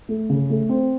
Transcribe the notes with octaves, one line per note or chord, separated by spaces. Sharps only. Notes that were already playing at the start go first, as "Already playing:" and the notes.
A3
C#3
A3
C4